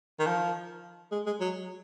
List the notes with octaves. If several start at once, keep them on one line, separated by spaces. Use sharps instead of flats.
D#3
F3
G#3
G#3
F#3